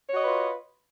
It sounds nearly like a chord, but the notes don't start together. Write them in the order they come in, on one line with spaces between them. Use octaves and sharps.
C#5 F#4 D#5 B4 F4